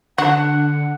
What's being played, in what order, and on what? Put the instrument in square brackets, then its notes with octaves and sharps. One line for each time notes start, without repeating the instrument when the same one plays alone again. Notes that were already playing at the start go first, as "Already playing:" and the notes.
[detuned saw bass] D3 [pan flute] D4 [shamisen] F#4 [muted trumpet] F#5